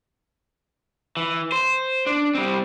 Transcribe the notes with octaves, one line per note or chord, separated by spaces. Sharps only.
E3
C5
D4
G3 C4